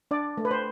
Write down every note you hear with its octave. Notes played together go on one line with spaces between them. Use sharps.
D4 D5
A3
B4
C5